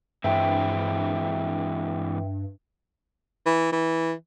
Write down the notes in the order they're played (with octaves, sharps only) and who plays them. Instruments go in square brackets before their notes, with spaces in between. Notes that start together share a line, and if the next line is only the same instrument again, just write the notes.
[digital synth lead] G2 [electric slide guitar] E3 G#3 C4 [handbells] E5 G5
[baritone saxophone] E3
E3